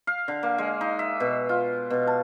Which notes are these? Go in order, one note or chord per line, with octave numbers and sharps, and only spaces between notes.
F5
D3
A#3
G#3
D#4
E5
B2
F4
B2
A5